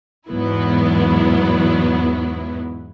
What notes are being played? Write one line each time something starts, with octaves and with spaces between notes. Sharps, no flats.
E2 G#2 F#3 B3 E4